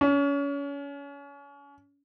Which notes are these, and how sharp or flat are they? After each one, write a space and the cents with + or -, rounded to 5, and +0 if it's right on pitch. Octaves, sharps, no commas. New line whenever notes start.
C#4 +30